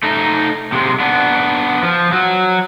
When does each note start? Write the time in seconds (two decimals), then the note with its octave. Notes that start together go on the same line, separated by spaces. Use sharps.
0.03 A3 D#4
0.72 C3 G#3
1.00 B3 D4
1.83 F3
2.12 F#3